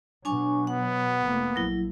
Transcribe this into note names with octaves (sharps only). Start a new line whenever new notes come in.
B2 F#3 D4 G#5 C#6
B3 F#5
F1 A3 A#3
A#1 F#3 E4